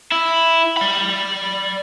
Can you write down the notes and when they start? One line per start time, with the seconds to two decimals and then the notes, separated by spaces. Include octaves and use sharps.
0.12 E4
0.77 D5 B5